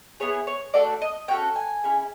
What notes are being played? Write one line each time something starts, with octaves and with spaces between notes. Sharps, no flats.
B3 E4 G#4 C#5
C#5
A3 D4 F#4 A4 D5
D#5
C#4 F#4 A4 G5
G#5
C#4 E4 G#4